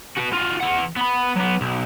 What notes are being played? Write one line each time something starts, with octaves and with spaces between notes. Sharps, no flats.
F#4 B4
F4 F#4
E3 F#5
B3 B5
F#3 B3
B1